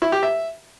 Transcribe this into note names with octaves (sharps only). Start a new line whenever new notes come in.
E4
G4
E5